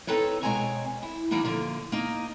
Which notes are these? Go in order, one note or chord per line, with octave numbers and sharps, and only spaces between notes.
C4 D#4 A4 B4 C#5
B2 G#3 C4 C#5 G#5 A#5
E4
E3 G3 A#3 B3 D#4
D3 F3 A#3
A#3 D#4